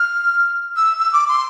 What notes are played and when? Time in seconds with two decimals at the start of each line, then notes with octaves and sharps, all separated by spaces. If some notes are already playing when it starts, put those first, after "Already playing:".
Already playing: F6
0.76 E6
0.99 E6
1.13 D6
1.28 C6